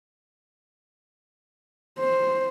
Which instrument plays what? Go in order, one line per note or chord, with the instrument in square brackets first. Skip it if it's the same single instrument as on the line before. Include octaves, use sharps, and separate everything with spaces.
[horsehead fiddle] C5